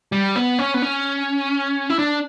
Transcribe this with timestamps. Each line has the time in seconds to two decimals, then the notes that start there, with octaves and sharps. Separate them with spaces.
0.12 G3
0.36 B3
0.59 C#4
0.74 B3
0.82 C#4
1.89 E4
1.99 D4